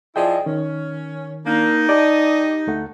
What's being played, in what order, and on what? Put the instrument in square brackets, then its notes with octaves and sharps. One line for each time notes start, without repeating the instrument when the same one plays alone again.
[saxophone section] F3 E4 G#4 [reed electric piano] D5 D#5 G5
[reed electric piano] D#3 [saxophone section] C#4
[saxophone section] A#3 D4 [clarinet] D#4
[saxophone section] G4 D#5 [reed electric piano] D5 A5 D6
[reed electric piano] D2 A3 F#5